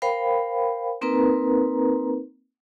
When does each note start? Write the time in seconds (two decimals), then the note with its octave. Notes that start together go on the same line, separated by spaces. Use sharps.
0.02 A#4 C5 F5 G5 B5
1.01 A#3 C4 D#4 A#4 B4 A#5